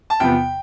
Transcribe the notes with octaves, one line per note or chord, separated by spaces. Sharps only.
A5
E2 C3 F3 B3 G5